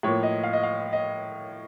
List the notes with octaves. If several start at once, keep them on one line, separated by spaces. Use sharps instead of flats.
A2 F3 A#3 C#5
D#5
F5
D#5
F5
D#5